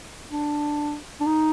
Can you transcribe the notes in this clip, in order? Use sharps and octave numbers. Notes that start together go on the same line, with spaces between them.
D4
D4
D#4